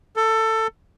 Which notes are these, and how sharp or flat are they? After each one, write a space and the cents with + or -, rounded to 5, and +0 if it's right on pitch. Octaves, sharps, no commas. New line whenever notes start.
A4 +20